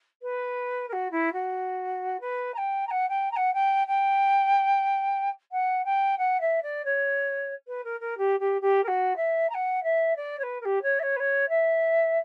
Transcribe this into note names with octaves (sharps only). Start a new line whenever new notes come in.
B4
A#4
F#4
E4
F#4
B4
A#5
G5
A#5
F#5
G5
A#5
F#5
G5
G5
F#5
G5
F#5
E5
D5
C#5
B4
A#4
A#4
G4
G4
G4
A#4
F#4
E5
A#5
F#5
E5
D5
C#5
B4
A#4
G4
C#5
E5
C#5
B4
C#5
E5